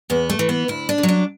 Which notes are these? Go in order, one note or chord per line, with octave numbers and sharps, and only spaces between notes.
E2 B3
A3
E3
B3
D2 E4
D4
D3
F#3
D4